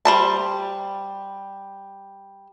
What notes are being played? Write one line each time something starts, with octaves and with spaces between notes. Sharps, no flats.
G3 C5 A5